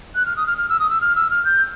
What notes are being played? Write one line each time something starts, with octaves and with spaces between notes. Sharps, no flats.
F#6
F6
D#6
F6
F6
E6
D#6
E6
F6
E6
F6
G6